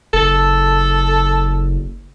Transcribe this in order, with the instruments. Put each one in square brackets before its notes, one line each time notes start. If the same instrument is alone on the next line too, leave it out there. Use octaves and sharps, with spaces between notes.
[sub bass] F#1 [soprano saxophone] A4